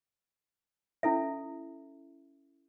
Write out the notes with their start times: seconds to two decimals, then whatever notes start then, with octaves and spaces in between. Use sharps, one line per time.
1.03 C#4 E4 A4 E5